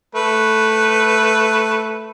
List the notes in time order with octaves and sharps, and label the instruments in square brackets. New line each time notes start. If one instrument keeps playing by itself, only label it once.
[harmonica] A3 B4